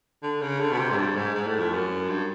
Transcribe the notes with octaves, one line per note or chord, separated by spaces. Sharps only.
D3
C#3
D3
B2
C3
G#2
G2
G#2
G#2
A2
F2
F#2
G2